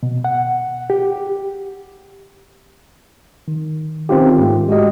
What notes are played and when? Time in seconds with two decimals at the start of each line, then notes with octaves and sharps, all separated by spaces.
0.03 B2
0.24 F#5
0.90 G4
3.48 D#3
4.09 D#3 C4 C#4 F4 G4
4.39 G#2 A3
4.68 G#3 F#4 G4 D#5